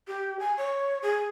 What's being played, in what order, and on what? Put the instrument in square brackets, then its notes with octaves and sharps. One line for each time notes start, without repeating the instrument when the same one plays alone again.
[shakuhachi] G4
G#5
C#5
G#4